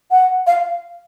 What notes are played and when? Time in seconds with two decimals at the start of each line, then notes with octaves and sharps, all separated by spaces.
0.11 F#5
0.47 F5